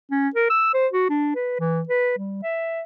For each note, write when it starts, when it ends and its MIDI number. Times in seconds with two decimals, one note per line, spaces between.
0.11 0.29 61
0.35 0.46 70
0.50 0.74 88
0.74 0.88 72
0.93 1.07 66
1.09 1.31 62
1.35 1.58 71
1.60 1.82 52
1.89 2.16 71
2.18 2.38 55
2.43 2.84 76